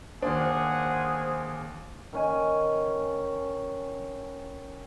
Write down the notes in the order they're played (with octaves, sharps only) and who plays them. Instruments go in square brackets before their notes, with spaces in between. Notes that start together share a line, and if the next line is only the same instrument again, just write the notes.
[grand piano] D#2 A#3 D4 [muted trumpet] G#4 [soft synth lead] C5 [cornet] F#5
[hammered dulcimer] D#3 C#4 G#5